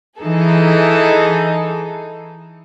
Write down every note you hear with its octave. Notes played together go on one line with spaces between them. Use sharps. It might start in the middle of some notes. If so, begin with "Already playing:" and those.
E3 D#4 G#4 A4